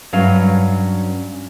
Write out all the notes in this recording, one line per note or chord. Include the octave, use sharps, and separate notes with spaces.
G2 F#3 C#4 F5